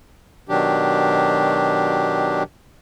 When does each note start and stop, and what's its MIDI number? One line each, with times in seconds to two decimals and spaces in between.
0.49 2.43 47
0.49 2.43 51
0.49 2.43 54
0.49 2.43 62
0.49 2.43 67